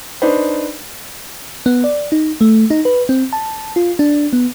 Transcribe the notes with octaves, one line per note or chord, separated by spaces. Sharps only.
D4 D#4 B4 C5
B3
D5
D#4
A3
D#4
B4
C4
A5
F4
D4
B3